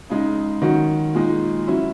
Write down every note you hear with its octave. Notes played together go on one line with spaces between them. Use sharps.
C#3 G#3 D#4
D#3 F#3 C#4 F#4
A#2 G#3 D#4
F#3 C#4 E4